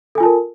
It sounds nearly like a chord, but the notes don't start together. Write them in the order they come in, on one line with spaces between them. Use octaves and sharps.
A4 G#5 F4 A5 A#4